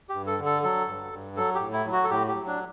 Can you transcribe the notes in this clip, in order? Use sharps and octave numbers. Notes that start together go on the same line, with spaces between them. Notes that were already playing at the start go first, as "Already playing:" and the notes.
G2 G4
A4
D3
A4
F#3 A4
G2
G2
F#3 A4
G4
A2
E4
F#3
F#4
A4
A2 G4
G4
F#3
D4